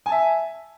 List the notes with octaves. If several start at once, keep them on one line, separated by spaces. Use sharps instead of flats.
E5 G#5 A5